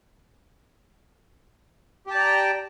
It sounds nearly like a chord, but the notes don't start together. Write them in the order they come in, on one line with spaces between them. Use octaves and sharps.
G4 A5 D5 A#5 G5